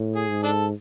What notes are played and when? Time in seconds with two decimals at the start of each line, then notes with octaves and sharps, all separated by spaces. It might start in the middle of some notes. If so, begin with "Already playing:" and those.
Already playing: A2
0.16 G#4
0.29 G#2
0.43 D4 A4